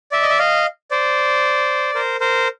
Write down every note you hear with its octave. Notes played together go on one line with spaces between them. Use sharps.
D5 E5
D#5
E5
D#5 F5
C5 D5
A#4 C5
A#4 C5